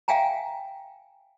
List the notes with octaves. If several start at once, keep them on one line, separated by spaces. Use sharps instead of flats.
E5 F5 G5 G#5 A#5